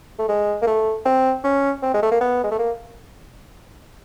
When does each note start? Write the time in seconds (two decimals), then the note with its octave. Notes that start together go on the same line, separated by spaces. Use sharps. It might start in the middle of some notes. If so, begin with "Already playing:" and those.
0.19 A3
0.29 G#3
0.62 A#3
0.67 A3
1.05 C4
1.44 C#4
1.82 C4
1.94 G#3
2.03 A3
2.12 A#3
2.21 B3
2.44 G#3
2.51 A3
2.59 A#3